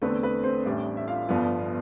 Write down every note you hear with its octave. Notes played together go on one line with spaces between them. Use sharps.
E2 D3 A3 C4 B4
B4
C4 C5
A1 A2 G3 D4 D5
E5
F4 F5
G1 G2 F3 B3